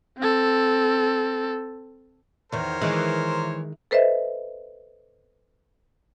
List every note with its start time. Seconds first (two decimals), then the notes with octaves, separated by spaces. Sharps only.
0.18 C4 A4
2.52 E2 D#3 A#4 C5 C#5
2.82 D#3 E3 G#3
3.91 A4 B4 C5 D#5 E5